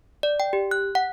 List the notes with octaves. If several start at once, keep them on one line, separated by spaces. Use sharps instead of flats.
D5
G5
G4
F#6
F#5